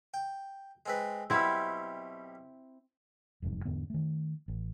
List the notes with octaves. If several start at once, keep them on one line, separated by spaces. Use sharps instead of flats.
G5
G#3 C4 B4
B1 B2 G3 C4 E4
E1 C2 F2 G#2
E2 G#2 D3 B3
D#3 A3
A1